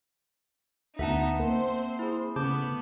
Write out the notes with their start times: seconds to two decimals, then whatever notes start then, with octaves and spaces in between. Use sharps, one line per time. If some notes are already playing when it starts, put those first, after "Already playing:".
0.99 D2 B3 D#4 E5 F#5 A5
1.39 A#3 C4 C5
1.99 E4 G#4
2.36 C#3 A3 B3 A5 D6 G6